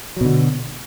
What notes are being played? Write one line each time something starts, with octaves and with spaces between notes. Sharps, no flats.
B2 D3 F#3